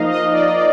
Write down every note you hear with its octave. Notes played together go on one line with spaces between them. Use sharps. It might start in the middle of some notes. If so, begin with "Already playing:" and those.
Already playing: F3 A#3 D#4 D#5 F5
D#5
D5
D#5
D5